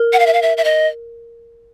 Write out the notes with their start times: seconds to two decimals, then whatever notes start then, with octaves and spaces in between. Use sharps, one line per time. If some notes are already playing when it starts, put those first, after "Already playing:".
Already playing: A#4
0.13 F#5
0.20 F5
0.26 E5
0.33 F5
0.42 E5
0.57 E5
0.64 D#5